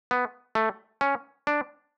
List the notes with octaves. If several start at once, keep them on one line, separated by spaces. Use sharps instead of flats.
B3
A3
C#4
D4